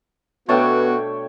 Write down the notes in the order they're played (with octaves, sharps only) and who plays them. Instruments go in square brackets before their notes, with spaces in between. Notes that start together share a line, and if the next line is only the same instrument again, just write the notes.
[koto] B2 A3 D4 [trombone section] B3 [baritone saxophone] F#4 [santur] C#5 G5